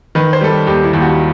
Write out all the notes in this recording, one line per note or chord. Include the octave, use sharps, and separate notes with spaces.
D#3 B4
C5
G3 A4
G4
D#2 G4
E4
D#2
F#4